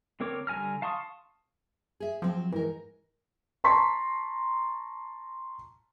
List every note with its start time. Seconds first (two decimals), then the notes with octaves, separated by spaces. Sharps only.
0.20 D3 C4 A#4 C#5 D6
0.47 D3 G3 G#5 A#5 F6
0.82 F5 A5 C6 C#6 D#6
2.00 G#4 E5
2.22 F3 F#3 C4
2.52 G#2 E3 A#4
3.64 A5 A#5 C6 C#6 B6